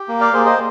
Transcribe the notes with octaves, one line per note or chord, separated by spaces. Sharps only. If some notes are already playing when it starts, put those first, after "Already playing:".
Already playing: G4
A#3
D5 F5
A#3 G#4 C5
C5 D#5